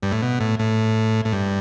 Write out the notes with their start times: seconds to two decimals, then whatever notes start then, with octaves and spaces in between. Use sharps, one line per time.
0.03 G2
0.12 A2
0.22 B2
0.40 A2
0.59 A2
1.25 A2
1.33 G2